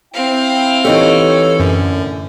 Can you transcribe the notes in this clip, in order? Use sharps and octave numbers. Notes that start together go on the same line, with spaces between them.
C4 E4 F5 G5
E3 D#4 G4 A4 C#5
F#2 A2 D3